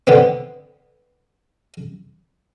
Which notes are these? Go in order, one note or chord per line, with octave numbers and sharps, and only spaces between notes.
D3 B3 C4